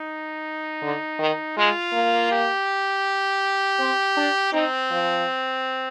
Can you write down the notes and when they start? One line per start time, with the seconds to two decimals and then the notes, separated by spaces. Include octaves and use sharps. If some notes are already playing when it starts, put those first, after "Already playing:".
Already playing: D#4
0.82 D3
1.19 D#3
1.57 G#3 F4
1.93 A#3
2.32 G4
3.80 C4
4.17 D4
4.53 C4 D#4
4.91 F3